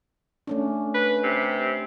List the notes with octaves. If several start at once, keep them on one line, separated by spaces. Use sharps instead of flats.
A3 C#4 D4
B4
C3